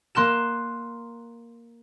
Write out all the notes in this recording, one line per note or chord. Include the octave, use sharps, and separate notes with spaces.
A#3 C6 F#6 E7